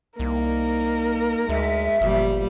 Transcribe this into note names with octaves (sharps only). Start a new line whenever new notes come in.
C2 A#3 D#4 A#4
D2 G#3 E5
G1 A#2 F3 G3